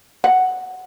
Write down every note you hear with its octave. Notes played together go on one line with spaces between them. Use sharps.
F#5